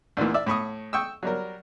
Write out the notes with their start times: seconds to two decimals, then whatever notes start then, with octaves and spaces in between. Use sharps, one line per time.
0.17 D2 A#2 D#3 E3
0.34 D5 E5
0.46 A2 B5 C#6 D#6
0.93 G5 C#6 D#6 E6
1.23 F#3 G3 A#4